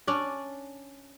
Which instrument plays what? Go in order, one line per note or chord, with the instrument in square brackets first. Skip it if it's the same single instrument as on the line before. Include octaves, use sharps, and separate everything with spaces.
[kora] C#4 D4 D5